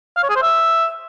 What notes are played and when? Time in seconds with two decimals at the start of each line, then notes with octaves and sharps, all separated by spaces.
0.17 F5
0.23 C#5
0.30 G#4
0.36 C5
0.42 E5